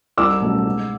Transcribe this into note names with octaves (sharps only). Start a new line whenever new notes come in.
C2 D6 E6
B2 F#3 A3 C#4
G#2